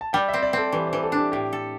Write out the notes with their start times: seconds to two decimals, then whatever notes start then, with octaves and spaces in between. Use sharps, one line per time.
0.01 A5
0.13 G3 G5
0.28 E5
0.34 C4
0.43 D5
0.53 C4 A4
0.72 E3 G4
0.87 C5
0.93 E3
1.03 A4
1.12 D4
1.17 G4
1.32 A2 G4
1.53 A4